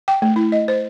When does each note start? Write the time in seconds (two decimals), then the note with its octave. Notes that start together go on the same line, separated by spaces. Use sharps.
0.08 G5
0.22 A3
0.36 E4
0.52 D#5
0.68 C5